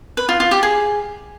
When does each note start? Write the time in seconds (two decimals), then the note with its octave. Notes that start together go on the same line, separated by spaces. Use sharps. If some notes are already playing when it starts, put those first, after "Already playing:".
0.17 B4
0.29 F4
0.40 F4
0.51 G4
0.63 G#4